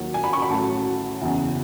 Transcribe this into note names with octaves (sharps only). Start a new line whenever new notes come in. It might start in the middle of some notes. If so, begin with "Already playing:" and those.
Already playing: D#2 D#3 F#3
G#5
B5
C#6
B5
A1 A2 F#3 A5
F#1 E2 C#3 E3